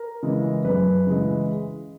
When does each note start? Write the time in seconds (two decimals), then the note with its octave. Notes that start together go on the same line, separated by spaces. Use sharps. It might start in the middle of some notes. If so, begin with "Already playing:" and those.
Already playing: A#4
0.23 C#3 E3 G#3
0.64 F#2 B4
1.07 C#3 E3 G#3